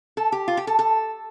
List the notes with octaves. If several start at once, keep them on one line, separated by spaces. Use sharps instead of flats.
A4
G4
F4
G4
A4
A4